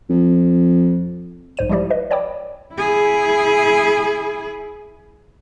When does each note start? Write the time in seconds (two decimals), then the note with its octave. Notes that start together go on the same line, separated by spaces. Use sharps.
0.10 F2
1.57 B1 G#2 C5 D#7
1.69 F3 G3 G#3 E4 G4 D5
1.90 B4 D#5
2.11 C#5 D5 G5 B5 D6
2.75 E4 G#4